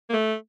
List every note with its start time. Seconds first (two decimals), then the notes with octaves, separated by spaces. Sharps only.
0.10 A#3
0.13 A3